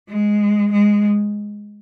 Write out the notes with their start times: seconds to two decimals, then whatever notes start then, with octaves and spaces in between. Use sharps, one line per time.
0.09 G#3
0.72 G#3